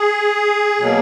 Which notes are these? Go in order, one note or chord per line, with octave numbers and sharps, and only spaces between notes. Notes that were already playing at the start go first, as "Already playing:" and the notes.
Already playing: G#4
B2 F#3 A#3